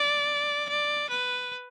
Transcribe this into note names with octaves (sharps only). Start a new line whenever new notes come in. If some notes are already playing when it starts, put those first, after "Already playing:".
Already playing: D5
D5
B4